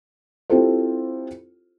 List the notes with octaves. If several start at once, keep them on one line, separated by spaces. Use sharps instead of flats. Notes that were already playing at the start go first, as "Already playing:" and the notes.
C4 E4 F4 G4 A4 C5